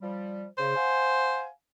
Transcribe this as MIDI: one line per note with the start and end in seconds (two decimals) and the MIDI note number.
0.02 0.46 53
0.02 0.46 55
0.58 0.73 49
0.58 1.47 72
0.76 1.49 77
0.76 1.49 78
0.76 1.49 80